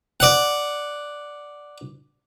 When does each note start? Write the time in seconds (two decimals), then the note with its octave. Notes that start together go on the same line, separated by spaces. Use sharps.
0.20 D5 F#5